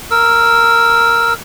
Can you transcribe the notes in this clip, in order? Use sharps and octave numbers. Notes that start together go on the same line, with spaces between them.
A#4 E6